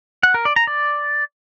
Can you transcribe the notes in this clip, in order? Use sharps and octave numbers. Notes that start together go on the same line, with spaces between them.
F#5
A#4
D5
A#5
D5